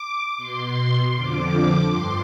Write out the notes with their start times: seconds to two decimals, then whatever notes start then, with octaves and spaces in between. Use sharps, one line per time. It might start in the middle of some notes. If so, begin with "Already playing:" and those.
Already playing: D6
0.37 B2 C6
1.14 F2 D3 F3 D6
1.90 G2 C6